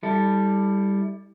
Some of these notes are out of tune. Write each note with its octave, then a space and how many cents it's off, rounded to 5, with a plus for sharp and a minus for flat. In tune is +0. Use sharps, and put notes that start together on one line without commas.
G3 +10 E4 -30 A4 +0